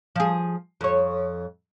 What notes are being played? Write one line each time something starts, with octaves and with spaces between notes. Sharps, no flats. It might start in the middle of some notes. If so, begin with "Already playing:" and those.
F3 G#4
F2 C#5